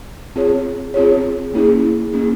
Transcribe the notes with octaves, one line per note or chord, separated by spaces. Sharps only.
C4 F4 G#4 C#5
C4 F4 G#4 C#5
A#3 C#4 E4 G#4
A#3 C#4 E4 G#4